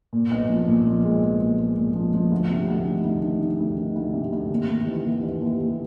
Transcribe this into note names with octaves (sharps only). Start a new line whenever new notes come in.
A#2
B1
F3
A#2
F3
G#3
B1
A#2
G#3
A#2
F3
F3
D2
C3
D2
D#3
D2
D#3
D#3
D2
D#3
D2
C3
D2
D#2
D#2
E3
D#2
E3
D#2
D#2